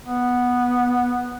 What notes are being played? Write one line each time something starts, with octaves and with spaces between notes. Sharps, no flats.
B3